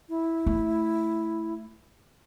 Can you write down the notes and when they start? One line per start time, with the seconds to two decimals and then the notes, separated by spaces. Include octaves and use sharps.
0.09 E4
0.47 A3